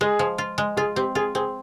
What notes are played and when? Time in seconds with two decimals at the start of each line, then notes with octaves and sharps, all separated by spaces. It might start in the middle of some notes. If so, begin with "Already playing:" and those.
0.01 G#3 G#4
0.19 F3
0.38 F4
0.58 G#3
0.77 F4 G#4
0.96 C4 G4
1.15 F4 G#4
1.35 C4 G#4